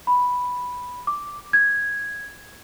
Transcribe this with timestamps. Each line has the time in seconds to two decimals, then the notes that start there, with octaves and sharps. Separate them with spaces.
0.07 B5
1.07 D6
1.53 G#6